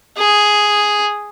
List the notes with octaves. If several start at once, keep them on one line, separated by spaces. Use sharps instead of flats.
G#4